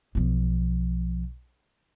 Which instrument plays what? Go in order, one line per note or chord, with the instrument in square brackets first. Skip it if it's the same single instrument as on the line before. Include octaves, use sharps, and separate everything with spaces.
[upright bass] B1 F3